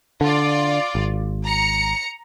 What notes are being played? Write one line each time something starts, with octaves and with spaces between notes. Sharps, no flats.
D3 F4 D5
G#1
A#5 C#7